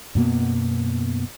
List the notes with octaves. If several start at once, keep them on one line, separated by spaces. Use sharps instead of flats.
F#2 B2 A#3 B3